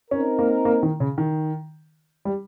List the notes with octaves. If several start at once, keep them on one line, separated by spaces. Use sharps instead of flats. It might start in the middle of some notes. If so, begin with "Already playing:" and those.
C4 C#4 D#4 A#4
A#3
A#3
D#3
C#3
D#3
G3